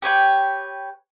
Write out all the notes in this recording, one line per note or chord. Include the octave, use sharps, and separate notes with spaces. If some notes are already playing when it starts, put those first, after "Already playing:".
G4 B4 C#5 G5